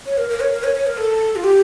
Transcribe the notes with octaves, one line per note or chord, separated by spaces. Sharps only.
C#5
A#4
A#4
C#5
A#4
C#5
C#5
A#4
A4
F4
G4